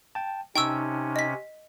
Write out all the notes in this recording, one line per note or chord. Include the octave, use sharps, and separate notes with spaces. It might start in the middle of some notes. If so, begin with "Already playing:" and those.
G5 A5
C3 C#4 D#4 G5 A5 C#6 E6
D#5 B6